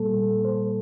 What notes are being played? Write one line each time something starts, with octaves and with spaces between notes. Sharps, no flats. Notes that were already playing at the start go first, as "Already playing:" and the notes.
Already playing: A#2 G3 A#3 A4
C5